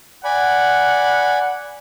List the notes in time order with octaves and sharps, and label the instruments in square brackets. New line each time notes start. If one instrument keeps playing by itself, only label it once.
[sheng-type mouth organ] D5 G#5 B5 [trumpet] F#5